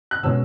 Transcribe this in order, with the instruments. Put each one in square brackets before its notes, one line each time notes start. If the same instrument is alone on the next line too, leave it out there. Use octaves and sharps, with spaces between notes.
[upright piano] F#6
B2 G#3 C#4 E6